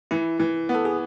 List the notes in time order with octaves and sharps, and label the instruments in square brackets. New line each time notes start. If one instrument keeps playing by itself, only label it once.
[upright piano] E3 [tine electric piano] E4
[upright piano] E3
B3
[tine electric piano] A4
G#4